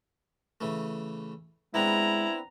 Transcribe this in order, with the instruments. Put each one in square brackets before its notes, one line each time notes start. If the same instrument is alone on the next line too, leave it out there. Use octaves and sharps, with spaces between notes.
[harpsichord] C#3 E3 A3
[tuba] G#3 [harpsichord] B3 C4 D4 [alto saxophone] E4 [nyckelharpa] A#5